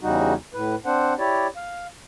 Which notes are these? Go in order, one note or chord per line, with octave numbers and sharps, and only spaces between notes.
E2 C#3 G3 D#4 F#4
A2 B4
C4 D4 C5 F#5
E4 G4 C#5 D5
F5